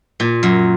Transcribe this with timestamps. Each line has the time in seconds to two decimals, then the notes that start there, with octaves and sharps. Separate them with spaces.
0.20 A#2
0.43 F#2